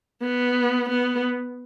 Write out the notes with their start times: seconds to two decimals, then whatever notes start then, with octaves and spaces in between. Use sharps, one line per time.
0.22 B3
0.89 B3